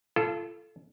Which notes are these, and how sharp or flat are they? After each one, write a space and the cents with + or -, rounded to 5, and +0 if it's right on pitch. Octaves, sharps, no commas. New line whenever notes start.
F4 -35 A4 -10